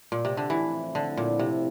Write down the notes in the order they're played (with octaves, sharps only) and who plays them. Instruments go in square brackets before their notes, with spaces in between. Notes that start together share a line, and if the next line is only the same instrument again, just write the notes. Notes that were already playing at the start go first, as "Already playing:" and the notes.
[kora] A#2
C3
D3
[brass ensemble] A2 F3 C4 E4 [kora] E3
[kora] D3
A#2
C3